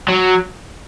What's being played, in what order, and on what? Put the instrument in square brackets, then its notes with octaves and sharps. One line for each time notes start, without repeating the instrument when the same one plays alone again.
[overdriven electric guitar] F#3